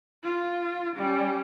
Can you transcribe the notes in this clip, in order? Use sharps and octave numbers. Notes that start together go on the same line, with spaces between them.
F4
G3 C#4